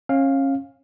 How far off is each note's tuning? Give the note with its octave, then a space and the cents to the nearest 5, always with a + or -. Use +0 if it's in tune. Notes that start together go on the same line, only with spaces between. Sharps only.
C#4 -30 F5 +5